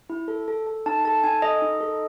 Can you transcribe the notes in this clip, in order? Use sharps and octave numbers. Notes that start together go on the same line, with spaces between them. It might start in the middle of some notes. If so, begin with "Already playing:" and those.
E4
A4
A4
A4
D#4 A5
A4 A5
D#4 G#5
A4 D#5
D#4
A4